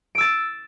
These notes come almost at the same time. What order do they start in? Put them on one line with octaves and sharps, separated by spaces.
D7 E6 A6